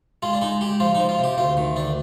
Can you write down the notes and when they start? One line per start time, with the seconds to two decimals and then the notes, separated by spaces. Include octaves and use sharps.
0.22 G#3 F4
0.33 D4
0.41 G#3 D#4
0.61 G#3 G4
0.80 F3 F4
0.95 D#4
1.00 F3
1.09 F4
1.19 C3 G4
1.38 D2 F4
1.57 D#3
1.76 D2 D4